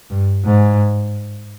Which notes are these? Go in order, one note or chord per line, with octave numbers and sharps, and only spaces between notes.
G2
G#2